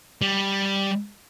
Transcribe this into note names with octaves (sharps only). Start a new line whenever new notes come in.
G3